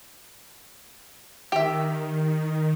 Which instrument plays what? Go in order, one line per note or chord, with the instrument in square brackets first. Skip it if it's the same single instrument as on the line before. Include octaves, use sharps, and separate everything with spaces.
[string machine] D#3 [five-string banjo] G4 E5